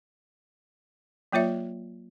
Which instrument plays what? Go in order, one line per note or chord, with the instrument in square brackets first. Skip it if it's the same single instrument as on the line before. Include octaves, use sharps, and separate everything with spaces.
[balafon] F#3 A#3 F4 C#5 E5